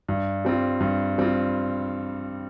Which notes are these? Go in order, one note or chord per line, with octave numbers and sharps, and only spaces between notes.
G2
G3 C4 F4
G2
G3 C4 F4